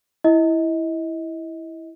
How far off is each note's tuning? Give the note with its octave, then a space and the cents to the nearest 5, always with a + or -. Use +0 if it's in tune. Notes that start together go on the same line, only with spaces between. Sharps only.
E4 +0 D#5 +30